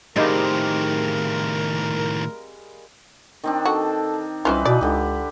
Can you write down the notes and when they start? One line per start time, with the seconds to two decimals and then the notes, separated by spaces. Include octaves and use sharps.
0.16 A2 D#3 G3 G#3 A#3 C4 D#4 A#4
3.44 D#3 C4 D4
3.65 F#4 A4
4.45 C2 E3 C4 C#4 D#4 F4 B4
4.65 B2 D5
4.81 C#2 D3 G4